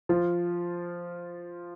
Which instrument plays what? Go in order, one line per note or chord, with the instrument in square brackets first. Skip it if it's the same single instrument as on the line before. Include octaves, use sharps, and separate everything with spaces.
[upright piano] F3 F4